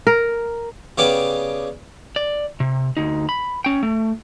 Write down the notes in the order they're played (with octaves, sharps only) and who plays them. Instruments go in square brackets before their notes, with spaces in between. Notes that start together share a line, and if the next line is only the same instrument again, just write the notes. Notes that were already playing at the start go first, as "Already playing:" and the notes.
[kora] A#4
[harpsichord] C#3 G3 B3 C#4 D6
[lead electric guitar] D5
C3
D2 D#4
B5
C#4 G5
A3